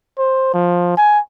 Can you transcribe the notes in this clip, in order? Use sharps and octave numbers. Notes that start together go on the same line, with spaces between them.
C5
F3
G#5